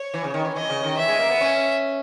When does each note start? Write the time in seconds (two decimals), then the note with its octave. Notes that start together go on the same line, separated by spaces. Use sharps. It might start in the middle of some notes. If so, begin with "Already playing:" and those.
Already playing: C#5
0.14 E3
0.24 C#3
0.34 D#3
0.45 E3
0.56 E3 D#5
0.70 C#3
0.83 D#3
0.97 E3 E5
1.08 G#3
1.19 A#3
1.30 B3
1.41 C#4